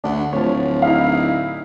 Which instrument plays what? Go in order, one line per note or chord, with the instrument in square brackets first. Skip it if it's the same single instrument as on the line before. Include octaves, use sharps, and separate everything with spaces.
[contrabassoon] D2 [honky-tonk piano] D4 F#5
[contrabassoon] D1 [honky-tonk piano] F3 C#5
[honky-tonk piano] D#4 E4 F5